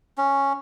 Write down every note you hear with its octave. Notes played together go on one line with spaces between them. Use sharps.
C#4